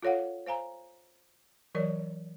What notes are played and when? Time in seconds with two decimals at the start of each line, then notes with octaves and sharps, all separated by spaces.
0.03 F4 A4 C#5 F5 F#5
0.46 C5 F5 G#5 A#5
1.75 E3 F#3 A#4 C#5 D5